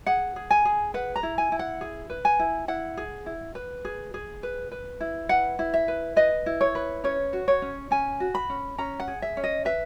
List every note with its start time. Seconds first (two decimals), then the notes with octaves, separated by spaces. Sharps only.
0.06 G#4 F#5
0.36 G#4
0.50 G#5
0.65 G#4
0.94 B4 F#5
1.16 A#5
1.23 E4
1.38 G#5
1.52 E4
1.59 F#5
1.81 G#4
2.10 B4
2.25 G#5
2.39 E4
2.68 E4 F#5
2.97 G#4
3.26 E4
3.55 B4
3.85 G#4
4.14 G#4
4.43 B4
4.72 B4
5.00 E4
5.29 B4 F#5
5.59 E4
5.74 E5
5.88 B4
6.16 B4 D#5
6.46 E4
6.61 C#5
6.75 B4
7.04 C#4 C#5
7.33 F#4
7.48 C#5
7.62 C#4
7.91 C#4 G#5
8.20 F#4
8.35 B5
8.50 C#4
8.78 C#4 A#5
9.00 F#5
9.08 G#4
9.22 E5
9.37 C#4
9.44 D#5
9.65 B4 E5